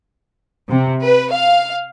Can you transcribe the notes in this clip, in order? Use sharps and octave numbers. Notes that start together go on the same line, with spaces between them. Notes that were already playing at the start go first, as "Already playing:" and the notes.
C3
B4
F5